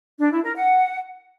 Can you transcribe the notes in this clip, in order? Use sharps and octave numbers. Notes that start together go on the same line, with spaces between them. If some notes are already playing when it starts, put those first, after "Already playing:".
D4
E4
A#4
F#5